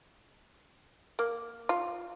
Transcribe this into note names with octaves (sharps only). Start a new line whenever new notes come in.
A#3
F4